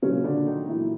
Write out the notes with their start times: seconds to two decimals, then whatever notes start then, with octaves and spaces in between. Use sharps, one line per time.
0.02 A#2 C#3 F#3 C#4
0.24 D3 D4
0.46 D#3 D#4
0.68 A#2 E3 F#3 E4